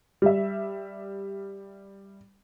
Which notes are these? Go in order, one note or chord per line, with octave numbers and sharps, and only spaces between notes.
G3 E5